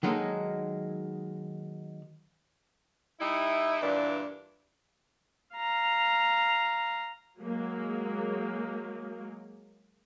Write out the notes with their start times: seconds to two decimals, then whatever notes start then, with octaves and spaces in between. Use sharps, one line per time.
0.03 D#3 F#3 G#3 A#3 D#4 A4
3.20 G3 D#4 E4
3.81 G2 A#2 E3 D4
5.56 F5 A#5
7.39 F#3 G#3 A#3